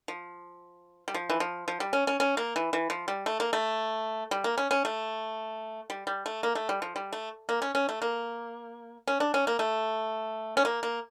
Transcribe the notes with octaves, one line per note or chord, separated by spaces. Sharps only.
F3
G3
F3
E3
F3
F3
G3
C#4
C#4
C#4
A#3
E3
E3
F3
G3
A3
A#3
A3
G3
A#3
C#4
C#4
A3
G3
G3
A3
A#3
A3
G3
F3
G3
A3
A#3
C#4
C#4
A3
A#3
C#4
D4
C#4
A#3
A3
C#4
A#3
A#3